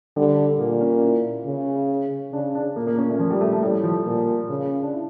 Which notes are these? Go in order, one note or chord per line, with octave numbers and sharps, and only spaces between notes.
D3 G3
A#2 A#3
C#4
E4
C#3
C#3 D4
D4
A#2 A#3
A#3
C#4
A3
F3
G3
A3
A3
A2 G3
F3
A#2
C#3
D4
E4